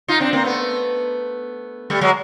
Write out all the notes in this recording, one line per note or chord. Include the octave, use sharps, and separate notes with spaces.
D#4 F4
C4 D4
A#3 C4
A3 B3
G3 A3
F#3 G#3